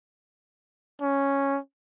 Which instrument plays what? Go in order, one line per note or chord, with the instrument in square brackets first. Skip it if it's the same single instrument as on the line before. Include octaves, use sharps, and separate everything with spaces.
[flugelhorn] C#4